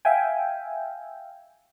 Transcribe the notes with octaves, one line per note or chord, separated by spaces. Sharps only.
E5 F5 G5 G#5